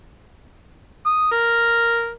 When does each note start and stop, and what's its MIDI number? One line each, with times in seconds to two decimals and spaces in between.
1.06 1.26 87
1.31 2.11 70